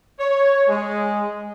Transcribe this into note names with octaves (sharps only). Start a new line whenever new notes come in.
C#5
G#3